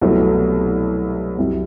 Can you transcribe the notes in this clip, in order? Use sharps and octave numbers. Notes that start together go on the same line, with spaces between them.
C2 B2 F#3 A3
C2 C3 F#3